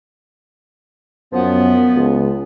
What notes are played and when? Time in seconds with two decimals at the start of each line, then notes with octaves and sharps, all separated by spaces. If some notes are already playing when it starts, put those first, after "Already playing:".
1.33 F#2 F3 B3
1.95 C#2